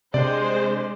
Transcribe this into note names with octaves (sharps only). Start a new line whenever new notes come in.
C3 G#3 D4 C5 D5